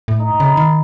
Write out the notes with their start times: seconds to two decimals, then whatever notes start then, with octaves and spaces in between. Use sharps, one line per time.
0.08 A2
0.19 D#4
0.40 C#3 B5
0.57 D#3